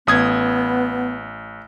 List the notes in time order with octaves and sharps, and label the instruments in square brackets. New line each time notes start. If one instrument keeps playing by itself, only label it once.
[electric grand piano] A1 D#6 G#6 [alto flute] B3